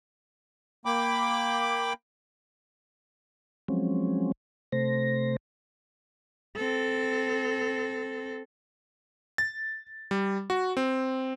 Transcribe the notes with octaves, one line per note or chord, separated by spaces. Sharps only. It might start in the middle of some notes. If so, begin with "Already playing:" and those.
A#3 G5 B5 D6
F3 F#3 G#3 C4 C#4
C3 A3 C5 A#6
C4 A4
A6
G3
F#4
C4